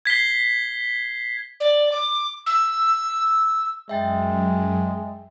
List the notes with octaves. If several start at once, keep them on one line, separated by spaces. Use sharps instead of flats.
G#6 B6 C7 G7
D5
D6
E6
F#2 G#3 E5 G5 A6